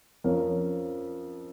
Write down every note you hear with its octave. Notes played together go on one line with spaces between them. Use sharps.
F2 F3 C#4 A#4